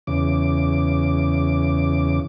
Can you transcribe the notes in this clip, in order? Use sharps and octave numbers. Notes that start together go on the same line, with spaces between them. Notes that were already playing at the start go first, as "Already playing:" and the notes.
E2 C#3 D6